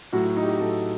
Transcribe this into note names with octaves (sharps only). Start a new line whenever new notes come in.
A2 F#3 F#4
F#4
D#4
G4
F#4
A2 F#3 A4